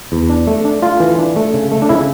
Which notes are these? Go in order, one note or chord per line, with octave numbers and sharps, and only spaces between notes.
E2
D4
A3
D4
A3 F4
E3
D4
A3
C#3
A3
D4
C#3 E4